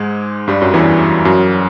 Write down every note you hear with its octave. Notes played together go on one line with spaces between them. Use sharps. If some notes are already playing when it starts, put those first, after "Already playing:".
Already playing: G#2 G#3
G2 G3
F#2 F#3
E2 E3
F#2 F#3